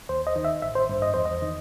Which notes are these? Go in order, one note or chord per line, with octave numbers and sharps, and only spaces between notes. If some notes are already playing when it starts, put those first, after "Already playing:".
D#2 C5
D#5
D#3
E5
A1 E5
C5
G2
D#5
E2 C5
D#5
D#3